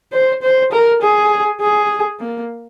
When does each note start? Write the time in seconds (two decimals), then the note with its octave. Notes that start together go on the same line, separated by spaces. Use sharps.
0.12 C5
0.42 C5
0.72 A#4
1.01 G#4
1.60 G#4
2.19 A#3